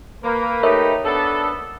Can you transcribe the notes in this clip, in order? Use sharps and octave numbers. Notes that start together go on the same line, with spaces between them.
A#3 B4
A3 D#4 G4 A#4 C#5 E5
B3 D4 A4